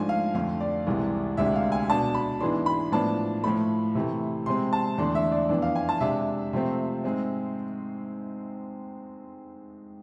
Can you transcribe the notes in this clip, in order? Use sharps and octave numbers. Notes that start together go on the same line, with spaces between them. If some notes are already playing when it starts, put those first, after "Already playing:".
Already playing: G#2 F3 A3 D4 G#5
F5
F2 D3 A3 F5
D5
C2 C3 E3 G#3
D2 C3 G#3 D4 E5
F5
G#5
B2 B3 D4 A5
B5
G#2 E3 G#3 B3 D4 C6
B5
A2 F3 B3 D4 A5
A2 F3 A3 B5
C3 E3 A3
C3 G#3 C4 C6
A5
E2 D3 A3 D4 C6
E5
D5
F2 E3 B3 D4
F5
G#5
A5
C3 G#3 D4 E5
C3 F3 A3 C4
G#2 G#3 C4